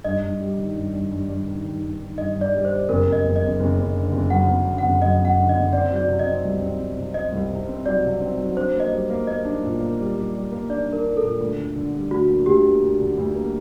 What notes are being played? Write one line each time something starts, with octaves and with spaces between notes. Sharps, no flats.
G2 D#5
G2
G3
D#3
G2
G2
G2
G2
D#3
D#3
G2
D#3
G2 D#5
G2
D5
G3
C5
G3
F#1 A#4
F#1
D#5
F#1
D#5
F#1
F#1
F#1
D3
F#1
F#2 F#5
F#1
D3
F#5
F#1
F#2 D#5
F#1
F#5
D3
D#5
F#1
C4 D5
F#3
D5
C3
D#5
C4
C2
C4
C3
C3
C4 D#5
C2
C3
C4
F#3 D5
C3
C4
F#3
D4 C5
A#3
D#5
G3
A#3
A#3 D#5
D4
A#2
A#3
G3
G3
G3
A#3
D4 D5
D4
A#4
D4
A4
A#2
D2
D3
D3
G3
D2 F#4
A#3
D2 G4
A#3
D2
D3
D2
A#3